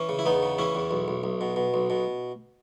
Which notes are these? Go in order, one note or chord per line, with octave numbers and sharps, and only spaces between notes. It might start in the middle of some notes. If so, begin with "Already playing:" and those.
Already playing: E3 C#4
C#3
E4
E2 B3 D#4
C#3
E3 C#4 E4
E2
B1
B1
B1
B2
B2
B1
B2